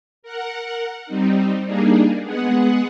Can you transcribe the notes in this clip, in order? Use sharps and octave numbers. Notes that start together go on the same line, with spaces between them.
A#4 F#5
G3 C4 D#4
G3 A#3 D4 D#4 G#4
G#3 B3 G#4 F#5